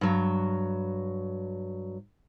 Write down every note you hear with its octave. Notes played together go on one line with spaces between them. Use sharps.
G2 F#3